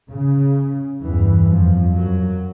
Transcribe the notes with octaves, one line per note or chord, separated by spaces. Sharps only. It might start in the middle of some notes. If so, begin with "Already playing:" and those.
C#3
E2 G2 E3
F2 F3
F#2 F#3